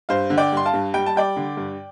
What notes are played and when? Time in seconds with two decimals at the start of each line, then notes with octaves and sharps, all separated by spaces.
0.09 G2 C5 F5
0.30 D3
0.37 D5 G5
0.52 G2 C6
0.66 F5 A5
0.73 G2
0.94 G3 G5
1.06 A5
1.16 G3 D5 G5
1.36 D3
1.57 G2